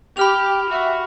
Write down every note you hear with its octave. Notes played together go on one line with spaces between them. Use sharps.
G4 G5 B5 F6 F7
F#4 E5